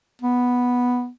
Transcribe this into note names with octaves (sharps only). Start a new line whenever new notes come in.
B3